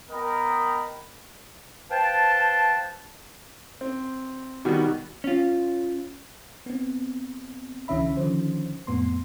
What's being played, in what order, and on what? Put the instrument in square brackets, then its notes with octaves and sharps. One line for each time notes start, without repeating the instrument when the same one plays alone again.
[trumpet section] B3 A#4 D#5 G5 A#5 B5
[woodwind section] B4 C5 F5 G5 A5
[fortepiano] C4
B2 D#3 G3 F#4
[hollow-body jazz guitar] C#4 F4
[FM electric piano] B3 C4
C2 D3 E3 C#4 E5 B5
D3 D#3 F3 C#4 C5
F2 A2 B3 C6